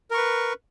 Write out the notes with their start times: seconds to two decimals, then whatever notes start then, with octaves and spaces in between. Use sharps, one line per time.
0.11 A#4
0.14 C#6
0.17 B4